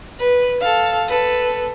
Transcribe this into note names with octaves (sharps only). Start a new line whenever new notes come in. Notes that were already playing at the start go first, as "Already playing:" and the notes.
B4
A4 F5
A4 B4